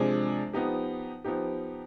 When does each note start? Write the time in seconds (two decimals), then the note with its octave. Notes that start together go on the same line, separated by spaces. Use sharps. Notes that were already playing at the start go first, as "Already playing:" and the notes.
Already playing: C3 F3 G#3 D4 G#4
0.53 F3 B3 D#4 G4
1.24 F3 B3 D#4 G4